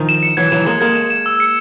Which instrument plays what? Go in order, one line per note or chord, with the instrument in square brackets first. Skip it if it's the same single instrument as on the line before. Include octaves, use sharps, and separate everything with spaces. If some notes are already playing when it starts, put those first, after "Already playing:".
Already playing: [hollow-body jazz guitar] D#3 F3
[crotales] E7
C#7
[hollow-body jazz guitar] E3 F#3 [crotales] G#6
[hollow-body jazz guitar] E3 F#3 [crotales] E7
[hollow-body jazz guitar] G#3 A#3 [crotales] G#6
[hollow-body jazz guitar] G#3 A#3 [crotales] G#6
[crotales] E7
E7
E6
C#7